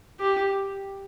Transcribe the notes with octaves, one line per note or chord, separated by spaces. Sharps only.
G4